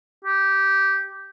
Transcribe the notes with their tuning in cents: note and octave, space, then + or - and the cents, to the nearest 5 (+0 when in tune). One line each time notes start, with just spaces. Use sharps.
G4 -10